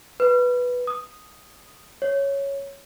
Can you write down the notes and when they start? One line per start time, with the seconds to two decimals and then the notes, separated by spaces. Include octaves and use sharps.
0.20 B4
0.87 D#6
2.02 C#5